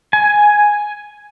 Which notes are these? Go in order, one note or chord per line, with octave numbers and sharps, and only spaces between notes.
G#5